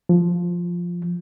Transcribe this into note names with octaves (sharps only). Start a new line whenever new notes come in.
F3